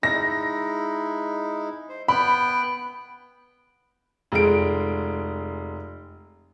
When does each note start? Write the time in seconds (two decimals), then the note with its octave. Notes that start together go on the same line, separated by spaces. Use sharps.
0.03 G#3 D#4 E4 A#6
1.89 C5
2.08 B3 G5 B5 F#6
4.32 F1 G#3 D7